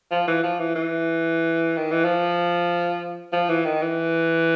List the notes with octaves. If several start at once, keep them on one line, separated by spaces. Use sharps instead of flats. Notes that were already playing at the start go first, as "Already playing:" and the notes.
F3
E3
F3
E3
E3
D#3
E3
F3
F3
E3
D#3
E3